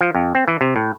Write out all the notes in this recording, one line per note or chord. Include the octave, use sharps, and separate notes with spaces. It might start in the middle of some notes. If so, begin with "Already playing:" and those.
F3
F2
C4
E3
C3
A2